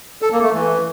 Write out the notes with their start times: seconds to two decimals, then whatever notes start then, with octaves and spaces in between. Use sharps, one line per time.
0.22 A4
0.32 A#3
0.43 A3
0.53 E3